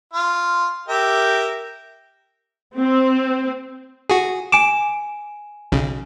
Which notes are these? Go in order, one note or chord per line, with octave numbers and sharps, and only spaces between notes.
F4
G4 A#4 E5
C4
F#4 G#4
G#5 D6 D7 E7
B1 C#3